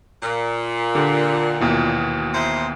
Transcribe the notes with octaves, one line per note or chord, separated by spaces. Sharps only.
A#2
D3 D4 G4
D#2 B2 E3
D#4 E4 C5